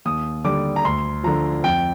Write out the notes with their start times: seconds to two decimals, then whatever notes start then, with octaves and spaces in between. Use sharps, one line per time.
0.05 D#2 D#6
0.44 D3 G3 D6
0.76 A#5
0.85 D2 C6
1.23 D3 F3 A#5
1.64 F2 G5